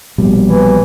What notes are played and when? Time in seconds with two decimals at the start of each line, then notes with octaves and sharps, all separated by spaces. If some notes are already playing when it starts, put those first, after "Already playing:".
0.18 A#1 B2 G3
0.48 E3